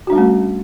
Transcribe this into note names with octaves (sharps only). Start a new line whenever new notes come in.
G3 A3 C#4 D4 F#4